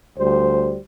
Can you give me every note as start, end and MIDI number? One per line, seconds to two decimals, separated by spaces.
0.19 0.78 38
0.19 0.78 55
0.19 0.78 72